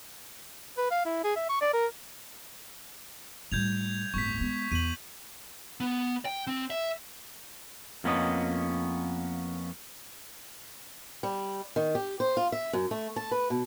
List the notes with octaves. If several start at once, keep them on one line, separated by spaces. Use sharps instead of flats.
B4
F5
E4
G#4
E5
C#6
D5
A#4
A2 G3 G6 G#6 F7
D1 G1 C#6 B6
G#3 B3
E2 D#7 F#7
B3
G5
C4
E5
F2 A#3 B3 C#4 D#5
G3
D#3
G4
C5
F4
E5
F#2
A3
A5
B4
B2